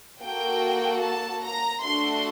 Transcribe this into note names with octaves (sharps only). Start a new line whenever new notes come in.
A#3 F#4 A4 G5
A5
A#5
A3 D4 F#4 A4 C6